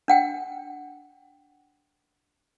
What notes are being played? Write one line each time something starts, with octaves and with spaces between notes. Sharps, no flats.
D4 F#5 G5